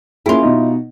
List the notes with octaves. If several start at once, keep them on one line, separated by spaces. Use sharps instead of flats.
A#3 C#4 E4 F4 G#4
B2 D#4